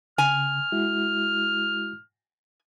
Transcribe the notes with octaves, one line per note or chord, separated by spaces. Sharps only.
C#3 G#5 F6
G#3 E4 F#4